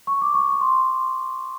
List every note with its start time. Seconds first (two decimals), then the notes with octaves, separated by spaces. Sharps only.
0.07 C#6
0.22 D6
0.34 C#6
0.48 C#6
0.61 C6